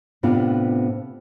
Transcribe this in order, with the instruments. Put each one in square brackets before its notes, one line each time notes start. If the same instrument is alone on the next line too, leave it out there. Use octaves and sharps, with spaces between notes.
[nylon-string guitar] A2 C3 B3 C4 D4 F4